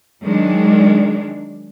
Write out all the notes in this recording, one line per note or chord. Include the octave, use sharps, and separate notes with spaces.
D#3 F#3 G#3 D4